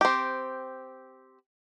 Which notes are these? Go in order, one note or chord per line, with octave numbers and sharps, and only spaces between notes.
C4 G4